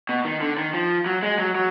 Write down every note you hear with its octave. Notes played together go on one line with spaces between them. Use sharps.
B2
D#3
D3
D#3
F3
F#3
G#3
F#3
F#3